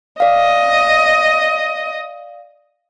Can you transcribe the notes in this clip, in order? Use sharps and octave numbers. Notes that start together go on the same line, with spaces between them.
D5 D#5 F5